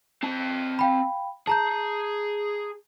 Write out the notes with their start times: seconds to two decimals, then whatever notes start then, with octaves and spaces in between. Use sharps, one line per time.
0.23 C4 A5
0.79 F5 G5 B5
1.47 G#4 A5 A#5 G6